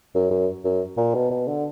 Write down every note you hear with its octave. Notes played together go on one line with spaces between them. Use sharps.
F#2
F#2
F#2
A#2
B2
B2
D3